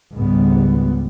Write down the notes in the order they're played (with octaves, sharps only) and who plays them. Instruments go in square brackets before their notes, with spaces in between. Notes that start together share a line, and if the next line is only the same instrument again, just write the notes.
[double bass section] C#2 G#2 G3 B3